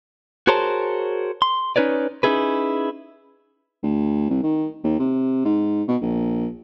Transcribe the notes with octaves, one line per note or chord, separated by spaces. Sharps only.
F#4 G#4 A#4 C5 C#5 A5
C6
C#4 D#4 B4 C#5 D5
C#4 D#4 E4 G#4 B4
D2
C2
D#3
D#2
C3
G#2
B2
A#1